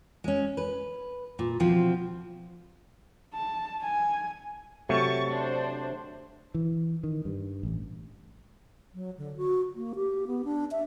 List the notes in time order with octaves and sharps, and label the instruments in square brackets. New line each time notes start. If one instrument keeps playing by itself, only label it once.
[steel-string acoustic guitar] G#3 C#4
B4
A#2
B2 F3 C4
[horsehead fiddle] A5
G#5
[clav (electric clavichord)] C3 F#3 A3 [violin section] C#6 A6
[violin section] D4 C5
[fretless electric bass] E3
D#3
G2
A1
[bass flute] F#3
D3
F#4
A#3
G4
B3
D4
E5